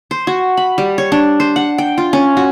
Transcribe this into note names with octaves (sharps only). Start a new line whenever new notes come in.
C5
F#4
B5
G3
C#5
D4
C5
F#5
G5
F4
C#4
F#4